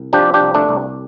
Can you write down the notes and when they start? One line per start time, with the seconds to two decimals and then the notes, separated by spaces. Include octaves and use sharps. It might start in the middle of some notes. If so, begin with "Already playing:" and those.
Already playing: C2
0.13 F3 D4 G4
0.34 D4 G4
0.41 C2
0.54 A3 D4
0.69 C2